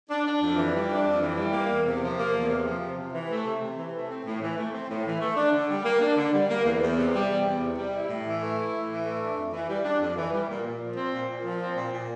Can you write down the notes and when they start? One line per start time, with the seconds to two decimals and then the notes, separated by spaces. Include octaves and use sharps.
0.09 D4
0.26 D4
0.41 F2
0.57 E3
0.74 G3
0.89 D4
1.06 F2
1.21 E3
1.37 G3
1.53 A#3
1.70 E2
1.85 C3
2.01 F3
2.18 A#3
2.33 E2
2.49 C3
2.65 F3
2.81 C3
2.97 C3
3.13 E3
3.29 A3
3.45 C3
3.61 C3
3.77 E3
3.92 A3
4.09 C4
4.25 A2
4.41 E3
4.57 A3
4.73 C4
4.89 A2
5.05 E3
5.21 A3
5.36 D4
5.53 D3
5.69 G3
5.84 A#3
6.01 D4
6.17 D3
6.33 G3
6.49 A#3
6.65 E2
6.81 E2
6.97 C3
7.13 G3
7.29 E2
7.45 E2
7.61 C3
7.77 G3
7.93 E4
8.09 A2
8.25 E3
8.41 A3
8.57 E4
8.73 A2
8.89 E3
9.05 A3
9.20 D4
9.36 F2
9.53 E3
9.69 G3
9.84 D4
10.00 F2
10.17 E3
10.33 G3
10.48 A#2
10.65 A#2
10.81 F3
10.96 C4
11.13 A#2
11.28 A#2
11.45 F3
11.60 C4
11.76 A#2
11.93 A#2